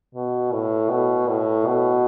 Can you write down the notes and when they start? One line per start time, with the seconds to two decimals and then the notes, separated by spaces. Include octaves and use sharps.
0.15 B2
0.52 A2
0.90 B2
1.28 A2
1.66 B2